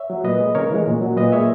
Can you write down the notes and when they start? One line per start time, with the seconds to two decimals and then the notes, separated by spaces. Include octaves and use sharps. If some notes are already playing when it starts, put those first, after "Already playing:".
Already playing: C#5 E5
0.10 F#3
0.24 A#2 B4 D#5
0.40 G#3
0.55 C#3 A#4 C#5
0.70 E3 G#3
0.86 A#2
1.02 F#3
1.17 A#2 B4 D#5
1.32 G#3 C#5 E5